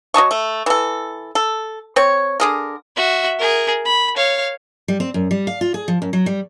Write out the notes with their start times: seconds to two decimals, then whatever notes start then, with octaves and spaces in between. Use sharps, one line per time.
0.14 F#3 D#5 A5 C#6
0.31 A3
0.66 E3 A4
1.35 A4
1.96 C4 C#5
2.40 D3 G#4 A#4
2.96 F#4 E5
3.38 G#4 A#4
3.85 B5
4.16 C#5 F5
4.88 G3
5.00 C4
5.14 F#2
5.31 G3
5.47 F5
5.61 F4
5.74 G#4
5.88 F3
6.02 F#2
6.13 F#3
6.26 G3